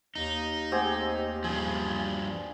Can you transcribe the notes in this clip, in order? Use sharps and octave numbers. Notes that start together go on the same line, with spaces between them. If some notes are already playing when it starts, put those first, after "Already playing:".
D#2 D#4
A3 C4 G4 G#4 C5 F#5
G2 F3 G#4